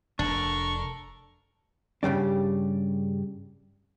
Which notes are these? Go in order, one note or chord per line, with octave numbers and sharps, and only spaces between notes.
F1 D4 A4 A#4 C#6
G2 C#3 G3 D4